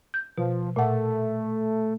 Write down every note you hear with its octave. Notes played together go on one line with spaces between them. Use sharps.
G6
B2 F3
A#2 A3 F#5